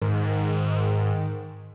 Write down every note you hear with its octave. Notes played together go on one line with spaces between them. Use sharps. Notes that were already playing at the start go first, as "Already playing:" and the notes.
G#2 D#3